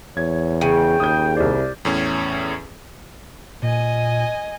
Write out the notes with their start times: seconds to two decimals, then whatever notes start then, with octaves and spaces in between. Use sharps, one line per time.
0.17 E2 C#5 G#6
0.61 C#3 G5 D#7
1.00 D#2 D#6 G6
1.37 C2 E4 C5 D5
1.85 E2 A2 C#4
3.62 A#2 D#5 G#5